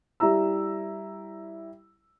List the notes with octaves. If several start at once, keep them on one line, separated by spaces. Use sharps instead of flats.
G3 E4 A#5 E6